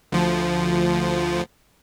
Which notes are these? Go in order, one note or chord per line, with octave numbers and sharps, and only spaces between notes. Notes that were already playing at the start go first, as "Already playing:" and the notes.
D2 F3